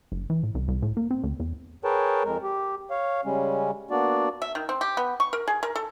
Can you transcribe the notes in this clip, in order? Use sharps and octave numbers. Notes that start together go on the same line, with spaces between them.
F#1
E3
A2
C2
C2
A2
A#3
C4
D2
E2
G#4 A#4 B4 C#5 G5 A5
F2 G#3 A#4
G4
C#5 F5
C#3 G3 G#3 C#4
A#3 B3 D4 F#4 D5
E5
D#3
C4
G4
B3
C#6
A#4
G#4
A#4
A4